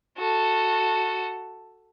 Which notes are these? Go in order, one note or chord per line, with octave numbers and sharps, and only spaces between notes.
F#4 A4